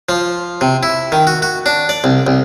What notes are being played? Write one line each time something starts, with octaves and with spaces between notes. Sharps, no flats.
F3
C3
E4
D#3
F#4
F#4
D4
D5
C2
C2